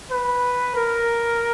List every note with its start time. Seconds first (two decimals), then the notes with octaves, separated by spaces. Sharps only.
0.11 B4
0.76 A#4